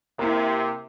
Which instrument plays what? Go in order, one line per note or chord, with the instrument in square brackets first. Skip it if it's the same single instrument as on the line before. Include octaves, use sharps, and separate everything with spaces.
[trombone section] C3 [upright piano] A#3 E4